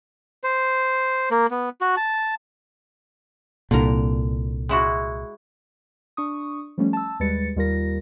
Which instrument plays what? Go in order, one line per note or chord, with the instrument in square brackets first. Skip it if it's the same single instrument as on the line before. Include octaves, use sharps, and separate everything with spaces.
[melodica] C5
A#3
B3
F#4
A5
[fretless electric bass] C2 A#2 [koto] D3 A#4
[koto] G#3 E4 F#4
[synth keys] D4 C#6 D#6
F3 G3 A3 C#4
A5 E6
D#2 G3 G#3 B4 A6 C#7
D#2 G3 F4 A#4 A#6